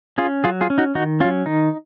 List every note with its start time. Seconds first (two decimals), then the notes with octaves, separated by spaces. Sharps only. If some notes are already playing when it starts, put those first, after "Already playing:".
0.18 C#4 F4 G#4
0.44 F#3 F4 G#4
0.61 F4 G#4
0.70 C#4
0.78 D#4 F#4
0.95 D#3 D#4 F#4
1.20 C#4 F4
1.24 F#3
1.46 D#3 D#4